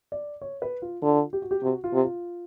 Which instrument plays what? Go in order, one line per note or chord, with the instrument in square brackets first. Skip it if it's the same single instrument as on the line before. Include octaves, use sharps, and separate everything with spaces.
[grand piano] D5
C#5
B4
F4
[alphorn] D3 [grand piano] F4
[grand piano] G4
F#4
G4
[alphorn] C3 [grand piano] F#4
[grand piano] F4
[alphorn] C3
[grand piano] F4